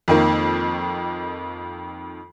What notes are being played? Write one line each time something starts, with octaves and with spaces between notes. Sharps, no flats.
F2 D#3 A#3